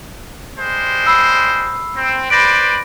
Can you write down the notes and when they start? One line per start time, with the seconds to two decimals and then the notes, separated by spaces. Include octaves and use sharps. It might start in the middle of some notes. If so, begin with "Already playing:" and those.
0.57 G3 G#3 C5
1.06 B5 E6 C7
1.95 C4
2.30 B4 C5 D5 B5 A#6 D7